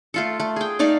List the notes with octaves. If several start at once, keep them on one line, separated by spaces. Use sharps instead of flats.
A3 F4 A4
A3
G#4 G5
A3 D#4 D5 F5